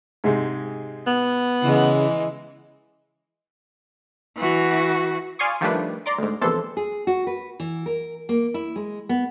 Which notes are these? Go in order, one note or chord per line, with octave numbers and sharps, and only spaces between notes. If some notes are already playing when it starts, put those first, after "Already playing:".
G#2 C3 G#3
B3
C#3 E3 G#3
E3 F#4
D5 F5 G#5 C6 C#6 D#6
D#3 F3 G3 A3 D4 B4
D5 A#5 C6 D6
D2 G#2
A#1 E2 C3 E3 A4 C6
G#4
F#4
B4
E3
A#4
A#3
E4
G#3
B3